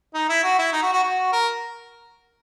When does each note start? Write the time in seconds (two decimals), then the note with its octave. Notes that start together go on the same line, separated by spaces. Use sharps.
0.14 D#4
0.29 E4
0.43 F#4
0.59 E4
0.72 D#4
0.82 F#4
0.93 F#4
1.03 F#4
1.32 A#4